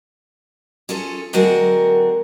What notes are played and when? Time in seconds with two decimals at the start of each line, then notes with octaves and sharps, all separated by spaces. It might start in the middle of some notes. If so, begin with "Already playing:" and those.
0.89 C#4 F4 G#4 A4 C#5
1.33 D3 F#3 G#3 C4 F#4 A#4